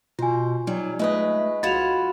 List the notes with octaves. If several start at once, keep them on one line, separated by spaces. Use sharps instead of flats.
B2 F4 C5 G#5
F#3 G3 D#4
G#3 A3 B4 D#5
B1 F4 F#4 B5 G#6 A6 E7 F7